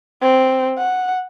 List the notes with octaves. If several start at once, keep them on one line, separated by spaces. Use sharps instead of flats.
C4
F#5